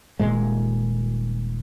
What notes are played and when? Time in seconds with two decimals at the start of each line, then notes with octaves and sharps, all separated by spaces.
0.19 D#1 A#2 G#3